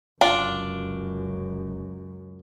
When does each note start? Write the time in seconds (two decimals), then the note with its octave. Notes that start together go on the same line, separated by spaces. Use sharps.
0.21 F1 C#2 F#2 D4 F4